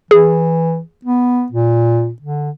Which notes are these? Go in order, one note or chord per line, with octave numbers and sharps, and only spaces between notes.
E3 G#4
B3
A#2
D3